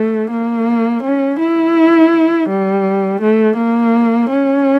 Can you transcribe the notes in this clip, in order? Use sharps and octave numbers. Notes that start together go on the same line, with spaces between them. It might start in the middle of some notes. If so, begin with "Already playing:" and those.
Already playing: A3
A#3
C#4
E4
G3
A3
A#3
C#4